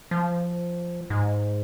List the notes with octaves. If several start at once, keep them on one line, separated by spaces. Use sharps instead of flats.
F3
G#2